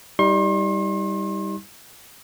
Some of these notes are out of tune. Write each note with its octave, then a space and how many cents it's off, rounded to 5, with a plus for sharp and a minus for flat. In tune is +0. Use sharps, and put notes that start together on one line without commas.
G3 +0 D#4 +40 C6 +40